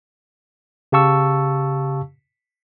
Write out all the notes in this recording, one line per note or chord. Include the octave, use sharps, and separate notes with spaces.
C#3 G4 F5 A5 C#6 E6